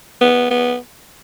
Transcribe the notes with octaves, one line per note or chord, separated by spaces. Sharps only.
B3
B3